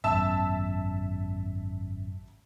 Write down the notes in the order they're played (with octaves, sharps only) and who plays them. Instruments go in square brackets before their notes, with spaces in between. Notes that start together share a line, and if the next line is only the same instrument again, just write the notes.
[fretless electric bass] G#1 F#2 B2 [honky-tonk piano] E5 A5 E6